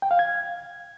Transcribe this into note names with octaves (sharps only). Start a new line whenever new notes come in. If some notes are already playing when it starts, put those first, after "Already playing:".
G5
F5
G#6